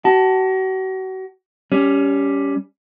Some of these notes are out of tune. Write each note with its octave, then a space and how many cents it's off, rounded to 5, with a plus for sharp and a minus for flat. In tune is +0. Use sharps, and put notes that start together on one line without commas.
F#4 +35 A5 +0
G3 +0 C#4 +20